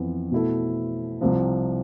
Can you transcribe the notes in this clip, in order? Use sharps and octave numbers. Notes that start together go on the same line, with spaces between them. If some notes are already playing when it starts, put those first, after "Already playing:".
Already playing: F2 E3 B3
B2 A3 E4 A4
C2 C3 F3